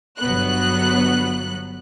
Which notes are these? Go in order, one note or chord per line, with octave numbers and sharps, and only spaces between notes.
G1 F#3 B3 F#6